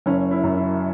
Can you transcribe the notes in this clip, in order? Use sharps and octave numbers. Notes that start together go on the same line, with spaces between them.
F#1 C#4
E4
F#2
E4